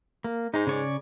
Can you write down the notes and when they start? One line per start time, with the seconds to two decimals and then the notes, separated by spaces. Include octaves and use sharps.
0.24 A#3
0.54 G#2 D#4
0.67 C#3 C#5 D5